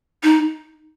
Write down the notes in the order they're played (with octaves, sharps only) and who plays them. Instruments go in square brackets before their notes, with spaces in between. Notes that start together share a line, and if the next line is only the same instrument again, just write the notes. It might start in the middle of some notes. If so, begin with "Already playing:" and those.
[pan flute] D#4